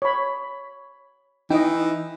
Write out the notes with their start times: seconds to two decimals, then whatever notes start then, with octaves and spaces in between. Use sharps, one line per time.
0.02 C#5 B5
1.50 E3 D#4 D#5 E5 G5